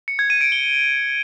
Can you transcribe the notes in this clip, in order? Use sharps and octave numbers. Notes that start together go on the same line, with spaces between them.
C#7
G#6
D#7
D7
G7